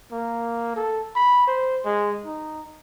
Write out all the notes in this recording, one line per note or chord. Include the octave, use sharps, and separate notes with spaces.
A#3
A4
B5
C5
G#3
D#4